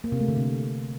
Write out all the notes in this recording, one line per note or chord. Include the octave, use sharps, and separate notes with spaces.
A#3
C3
A3
D3
C3